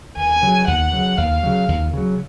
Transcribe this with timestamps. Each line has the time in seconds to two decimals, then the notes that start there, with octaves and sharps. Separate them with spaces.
0.17 D#2 G#5
0.42 C#3 F#3
0.67 D#2 F#5
0.93 C#3 F#3
1.17 D#2 F5
1.43 C#3 F#3
1.68 D#2
1.93 C#3 F#3